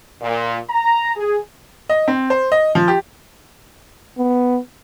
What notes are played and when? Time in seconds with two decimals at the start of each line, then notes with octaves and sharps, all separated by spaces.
0.21 A#2
0.70 A#5
1.16 G#4
1.89 D#5
2.08 C4
2.30 C5
2.52 D#5
2.75 F3
2.88 G4
4.18 B3